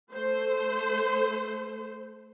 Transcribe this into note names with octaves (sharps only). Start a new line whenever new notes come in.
A3 C5